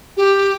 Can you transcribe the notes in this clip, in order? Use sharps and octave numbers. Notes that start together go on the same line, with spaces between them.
G4